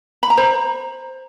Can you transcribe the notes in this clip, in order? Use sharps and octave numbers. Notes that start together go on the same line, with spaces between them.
B5
A#5
C5